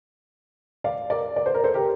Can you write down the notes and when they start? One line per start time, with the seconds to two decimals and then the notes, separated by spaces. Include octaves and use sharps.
0.84 D5 F5
1.10 A#4 D5
1.36 D5
1.46 C5
1.54 A#4
1.64 A4 C5
1.74 G4 A#4